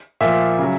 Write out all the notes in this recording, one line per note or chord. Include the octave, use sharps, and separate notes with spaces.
A#2 F3 E5
C#3 F#3